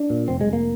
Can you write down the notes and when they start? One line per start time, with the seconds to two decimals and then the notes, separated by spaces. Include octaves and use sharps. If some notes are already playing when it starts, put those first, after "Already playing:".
Already playing: D4
0.10 A#2
0.28 F1 C4
0.41 G#3
0.47 F1
0.53 A#3